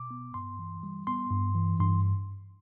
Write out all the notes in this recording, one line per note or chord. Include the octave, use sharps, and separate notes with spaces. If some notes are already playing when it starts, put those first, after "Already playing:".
Already playing: B2 D6
B3
G2 C6
E3
G3
B3 C6
G2
E3
G2 C6